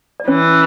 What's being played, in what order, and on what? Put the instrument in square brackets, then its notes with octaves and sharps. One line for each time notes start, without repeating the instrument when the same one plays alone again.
[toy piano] D5
[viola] E3 [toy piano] C#4 C#5